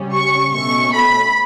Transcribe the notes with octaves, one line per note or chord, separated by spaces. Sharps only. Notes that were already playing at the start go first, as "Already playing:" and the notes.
Already playing: C#3 G3 C#4
C#6
B2 A3 C#4 C#6
B5